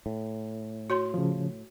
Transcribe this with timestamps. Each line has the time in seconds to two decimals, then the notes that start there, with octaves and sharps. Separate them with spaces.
0.06 A2
0.90 F#4 C#5 C6
1.14 C#3 F3